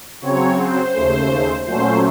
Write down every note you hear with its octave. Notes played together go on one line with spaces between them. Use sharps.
C#3 F#3 C4 C#5
C5
D#2 C#3 A3
A#2 F#3 A3 C#4 C5